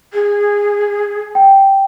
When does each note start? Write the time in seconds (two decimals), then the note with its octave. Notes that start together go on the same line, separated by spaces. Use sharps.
0.13 G#4
1.35 G5